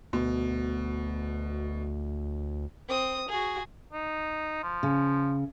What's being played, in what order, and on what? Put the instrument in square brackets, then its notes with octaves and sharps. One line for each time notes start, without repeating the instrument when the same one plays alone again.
[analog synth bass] D2 [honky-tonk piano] B2
[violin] C4 D#6
F#4 G#4
[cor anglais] D#4
F3
[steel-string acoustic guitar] C#3